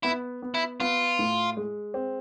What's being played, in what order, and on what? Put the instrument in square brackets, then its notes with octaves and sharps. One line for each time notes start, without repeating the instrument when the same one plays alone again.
[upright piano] B3 [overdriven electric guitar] E4
[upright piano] B3
[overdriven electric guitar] E4
[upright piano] B3 [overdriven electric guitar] F4
[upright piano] A2
G#3
C4